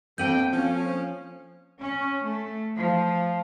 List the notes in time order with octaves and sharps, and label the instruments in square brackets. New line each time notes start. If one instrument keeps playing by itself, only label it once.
[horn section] B2 G5 [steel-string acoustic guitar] A#3 C4 D4 [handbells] A4 G6
[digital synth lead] F3 [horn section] C#4
[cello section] C#4
A3
F3